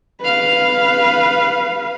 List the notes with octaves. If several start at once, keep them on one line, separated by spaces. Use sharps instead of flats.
B4 F5